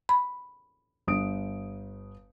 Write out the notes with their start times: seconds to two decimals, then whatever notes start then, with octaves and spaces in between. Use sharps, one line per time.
0.09 B5
1.07 G1 D#6 D7